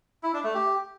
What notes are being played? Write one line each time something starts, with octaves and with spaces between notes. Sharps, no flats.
E4
D4
A3
G4